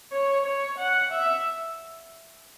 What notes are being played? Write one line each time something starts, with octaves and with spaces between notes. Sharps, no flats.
C#5
C#5
F#5
E5